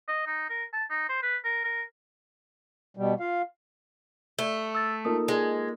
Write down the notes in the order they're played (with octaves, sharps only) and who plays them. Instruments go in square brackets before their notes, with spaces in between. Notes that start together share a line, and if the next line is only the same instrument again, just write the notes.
[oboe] D#5
D#4
A#4
A5
D#4
C5
B4
A#4
A#4
[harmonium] B2 G3
F4 F5
[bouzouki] A3 [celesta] G7
[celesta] E6 A6
[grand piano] A#3 D#4 A4 [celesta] F4 A#4 D#6
[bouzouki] G#3